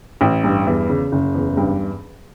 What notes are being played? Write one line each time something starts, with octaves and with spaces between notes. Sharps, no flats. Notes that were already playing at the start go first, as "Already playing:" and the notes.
A1
G2
E2
C#3
F#1
E2
G2